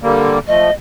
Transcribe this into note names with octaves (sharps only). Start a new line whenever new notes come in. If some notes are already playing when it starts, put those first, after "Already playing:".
D3 G3 A#3
F3 A3 D#5